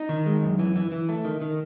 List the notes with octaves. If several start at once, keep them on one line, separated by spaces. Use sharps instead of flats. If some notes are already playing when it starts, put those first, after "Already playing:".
Already playing: D#4
D#3
G#3
F#2
E3
E3
E3
A3
D#3
D#3